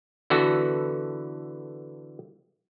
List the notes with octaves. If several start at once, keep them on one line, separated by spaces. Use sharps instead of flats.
D3 E3 B3 F#4 A4